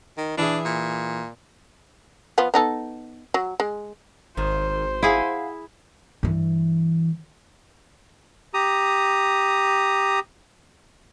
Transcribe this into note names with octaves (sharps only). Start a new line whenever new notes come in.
D#3
E3 D4 E4 G#4
A#2
F3 B3 F4
B3 D#4 A4
F#3
G#3
G#1 D#3 C5
E4 G#4 F5 F#5 G#5
G2 E3
G4 A#5 D#6